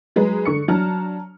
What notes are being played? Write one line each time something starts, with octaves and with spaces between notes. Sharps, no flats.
F#3 G#3 B4 A#5
D3 C#6 C#7
F#3 D4 A5 A#5 F6